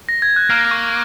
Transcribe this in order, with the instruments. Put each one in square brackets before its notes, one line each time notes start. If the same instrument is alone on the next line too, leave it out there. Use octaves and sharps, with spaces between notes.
[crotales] A#6
G#6
F#6
[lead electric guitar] A#3 [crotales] F6
[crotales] C#6